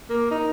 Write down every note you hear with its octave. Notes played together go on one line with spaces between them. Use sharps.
A#3
D#4